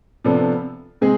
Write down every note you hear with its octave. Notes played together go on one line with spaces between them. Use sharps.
C3 F3 B3 D4 A4
C3 G#3 C4 G#4